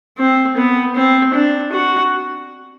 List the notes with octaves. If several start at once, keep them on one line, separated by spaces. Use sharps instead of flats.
C4
B3
C4
D4
F#4